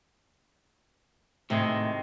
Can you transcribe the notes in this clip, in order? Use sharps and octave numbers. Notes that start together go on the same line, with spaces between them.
A2 C3 D#3 G#3